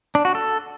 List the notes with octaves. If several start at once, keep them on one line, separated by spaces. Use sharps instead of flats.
D4
F#4
A4